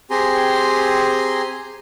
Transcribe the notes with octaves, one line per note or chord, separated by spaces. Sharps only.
C4 G4 G#4 G#5 A#5 C6